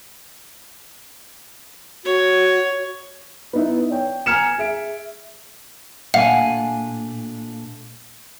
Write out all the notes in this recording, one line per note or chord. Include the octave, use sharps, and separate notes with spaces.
F#4 C#5
B3 D#4 E4
C#5 G5
G#5 A#5 F6 G#6 C#7 E7
G#4 E5 D7
A#2 A3 D4 F5 F#5 G#5